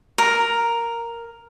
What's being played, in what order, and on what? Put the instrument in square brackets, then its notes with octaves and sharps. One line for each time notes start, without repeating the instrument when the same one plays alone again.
[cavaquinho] A#4